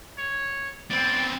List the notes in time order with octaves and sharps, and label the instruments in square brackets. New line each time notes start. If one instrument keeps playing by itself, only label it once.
[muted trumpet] C#5
[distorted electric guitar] B3 C4 [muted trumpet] D5